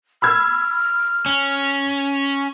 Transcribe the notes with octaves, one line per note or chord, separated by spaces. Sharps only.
B5 E6 F6 G#6
C#4